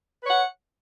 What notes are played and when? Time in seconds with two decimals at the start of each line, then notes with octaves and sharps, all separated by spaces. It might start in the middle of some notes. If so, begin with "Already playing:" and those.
0.22 B4
0.25 C#5
0.28 F#5